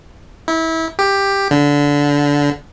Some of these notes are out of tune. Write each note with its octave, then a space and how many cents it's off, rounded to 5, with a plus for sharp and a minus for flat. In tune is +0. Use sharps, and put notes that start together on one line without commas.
E4 -25
G4 +10
D3 -20